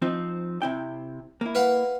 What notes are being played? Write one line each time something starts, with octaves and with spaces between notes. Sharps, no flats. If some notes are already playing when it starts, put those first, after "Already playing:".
F3 C4 D#4
C3 E4 G5
A#3 E4
B4 F5 F#5